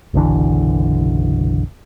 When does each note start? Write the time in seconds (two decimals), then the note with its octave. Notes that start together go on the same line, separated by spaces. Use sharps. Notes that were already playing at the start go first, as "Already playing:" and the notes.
0.14 F#1 B1 D3 E3